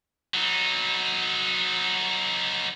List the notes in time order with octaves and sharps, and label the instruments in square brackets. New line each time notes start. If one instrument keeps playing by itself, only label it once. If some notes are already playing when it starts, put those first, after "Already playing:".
[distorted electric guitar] F#3 D#4